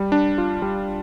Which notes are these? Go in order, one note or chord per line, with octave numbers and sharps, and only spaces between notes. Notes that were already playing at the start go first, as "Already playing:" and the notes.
Already playing: G3
D4
F4
G3